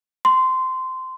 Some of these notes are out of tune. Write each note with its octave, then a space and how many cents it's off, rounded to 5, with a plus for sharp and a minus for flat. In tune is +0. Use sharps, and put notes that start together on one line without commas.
C6 -15